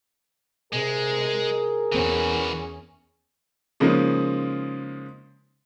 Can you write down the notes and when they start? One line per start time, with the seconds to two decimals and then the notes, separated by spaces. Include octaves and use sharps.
0.73 C3 G#3 G#4 A#4
1.92 E2 E3 C#4 F#4
3.80 C#3 F3 G#3 A#3 C#4 D#4